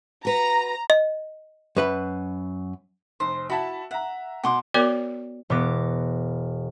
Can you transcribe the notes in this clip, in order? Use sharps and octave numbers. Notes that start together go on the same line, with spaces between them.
F#4 B4 A#5
D#5
F#2 B4 B5
F1 C5
E4 F#4 E5 A5 B5
E5 F#5 A#5
B2 F#5 C6 D6
B3 F#4 A#4 C#5 D5 D6
E1 B3 D6 A#6